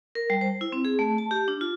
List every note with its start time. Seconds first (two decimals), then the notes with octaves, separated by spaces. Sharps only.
0.15 A#4
0.30 G3
0.41 C5
0.61 E4
0.72 C4
0.85 G#4
0.99 A3
1.18 A5
1.31 G4
1.48 D4
1.61 F4